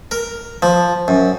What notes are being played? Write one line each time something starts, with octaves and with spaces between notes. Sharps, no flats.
A#4
F3
F#2